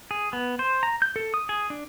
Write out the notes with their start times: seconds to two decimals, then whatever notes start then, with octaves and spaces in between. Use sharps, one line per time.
0.11 G#4
0.33 B3
0.59 C5
0.83 A#5
1.02 G6
1.16 A4
1.34 D#6
1.49 G#4
1.70 D4